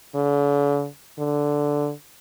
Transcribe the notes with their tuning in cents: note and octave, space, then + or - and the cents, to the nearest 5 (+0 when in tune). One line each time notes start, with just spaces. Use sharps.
D3 -45
D3 -5